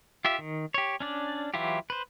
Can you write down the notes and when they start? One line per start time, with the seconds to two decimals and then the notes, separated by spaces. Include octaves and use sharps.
0.25 F4 G4 E5
0.39 D#3
0.74 G4 C#5
1.00 C#4 D4 D5
1.54 E3 F#3 E4 F4 G4
1.90 B4 C5